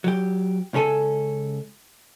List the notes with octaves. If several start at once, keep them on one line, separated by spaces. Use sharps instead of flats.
F#3 G4
C#2 C#3 C#4 A4 G#5